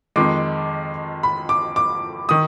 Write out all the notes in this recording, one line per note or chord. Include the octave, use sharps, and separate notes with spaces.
F2 D#3 G#3 D6
B5
D6
D6
D#3 D#6